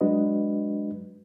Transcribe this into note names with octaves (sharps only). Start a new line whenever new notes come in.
F#3 G#3 D4 F#4 B4 D#5